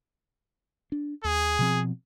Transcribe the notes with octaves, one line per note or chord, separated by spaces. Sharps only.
D4
D#2 G#4
B2 F3 C4